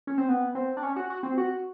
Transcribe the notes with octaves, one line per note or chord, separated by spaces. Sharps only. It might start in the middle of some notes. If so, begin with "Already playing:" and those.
C#4
C4
B3
C4
D4
C#4
F#4
F#4
C4
F#4